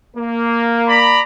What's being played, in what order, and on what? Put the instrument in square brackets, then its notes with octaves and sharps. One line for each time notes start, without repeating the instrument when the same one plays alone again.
[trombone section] A#3
[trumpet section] D5 A#5 B5